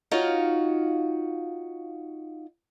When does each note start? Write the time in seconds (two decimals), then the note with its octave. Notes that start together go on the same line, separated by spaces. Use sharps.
0.11 D#4 F4 F#4 C#5 F5